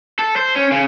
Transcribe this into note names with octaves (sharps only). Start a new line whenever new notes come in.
A4
C5
C#4
C#3